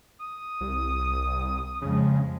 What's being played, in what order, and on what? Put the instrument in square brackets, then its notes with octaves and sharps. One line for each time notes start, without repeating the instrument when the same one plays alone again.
[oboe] D#6
[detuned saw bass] C2
[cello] F2 G#3 [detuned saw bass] C#3